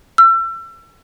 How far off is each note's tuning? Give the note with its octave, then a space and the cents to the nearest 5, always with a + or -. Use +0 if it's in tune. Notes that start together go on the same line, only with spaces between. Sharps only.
E6 +35